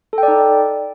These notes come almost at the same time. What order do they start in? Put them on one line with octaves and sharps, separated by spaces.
A4 G5 D5 D#4